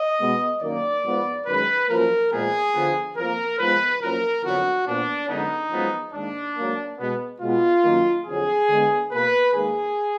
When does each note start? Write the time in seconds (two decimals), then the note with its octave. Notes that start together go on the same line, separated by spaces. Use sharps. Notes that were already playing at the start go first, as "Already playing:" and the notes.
Already playing: D#5
0.18 B2 G#3 B3
0.60 F#2 D#3 A#3 D5
1.03 G#2 F3 B3
1.46 F#2 D#3 G#3 B4
1.88 F#2 F3 A#3 A#4
2.31 A#2 F3 G#3 B3 G#4
2.73 D3 F3 B3
3.16 F2 F3 A#3 A#4
3.58 G#2 F3 G#3 B3 B4
4.01 F#2 F3 A#3 A#4
4.43 F2 D3 F#3 B3 F#4
4.86 A#2 F3 B3 D4
5.28 F#2 D3 G#3 B3 D#4
5.70 F#2 F3 G#3 B3
6.13 G#2 D#3 A#3 D4
6.55 G#2 F#3 A#3
6.98 B2 G#3 B3
7.40 B2 G#3 B3 F4
7.82 F#2 D#3 A#3
8.25 F2 D3 F#3 G#4
8.68 D3 G#3 B3
9.10 B2 A#3 B4
9.53 G#2 D#3 A#3 G#4